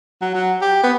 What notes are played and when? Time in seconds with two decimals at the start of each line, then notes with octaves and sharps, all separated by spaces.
0.21 F#3
0.34 F#3
0.61 G4
0.83 B3